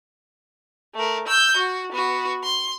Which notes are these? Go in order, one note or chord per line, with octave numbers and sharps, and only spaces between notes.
A3 A#4
E6 G6
F#4
B3 F#4
C6